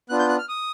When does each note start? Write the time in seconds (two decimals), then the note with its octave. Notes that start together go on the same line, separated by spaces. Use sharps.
0.09 B3 D4 F4 F#6
0.19 G6
0.29 F#6
0.38 F6
0.49 D#6